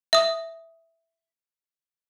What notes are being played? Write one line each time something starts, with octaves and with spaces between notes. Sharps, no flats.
E5 D#6